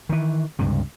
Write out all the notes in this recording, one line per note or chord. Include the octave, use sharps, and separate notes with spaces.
D#3 E3
C#2 G2 C3